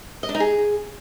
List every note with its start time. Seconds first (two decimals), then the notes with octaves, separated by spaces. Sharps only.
0.23 D#5
0.29 D4
0.35 D#4
0.40 G#4